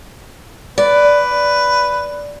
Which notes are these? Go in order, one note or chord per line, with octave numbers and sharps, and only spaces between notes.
B4 D5